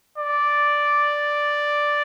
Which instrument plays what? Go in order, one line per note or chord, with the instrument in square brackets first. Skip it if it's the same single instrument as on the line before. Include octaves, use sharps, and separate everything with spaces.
[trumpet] D5